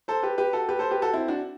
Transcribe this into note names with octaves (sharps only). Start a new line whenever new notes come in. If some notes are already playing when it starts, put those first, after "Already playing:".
A4 C5
G4 B4
G4 B4
F#4 A4
G4 B4
A4 C5
G4 B4
F#4 A4
C4 E4
D4 F#4